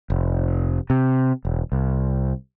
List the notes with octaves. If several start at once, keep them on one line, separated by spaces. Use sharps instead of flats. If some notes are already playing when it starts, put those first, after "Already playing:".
F1
C3
E1
C2